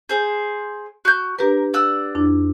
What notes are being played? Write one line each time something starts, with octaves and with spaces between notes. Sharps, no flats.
G#4 C5
F#4 G6
D4 G4 A#4 B4
D5 F#5 E6
F2 D4 E4